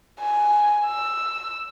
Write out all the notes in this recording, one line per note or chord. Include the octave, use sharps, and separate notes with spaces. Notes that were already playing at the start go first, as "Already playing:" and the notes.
G#5
E6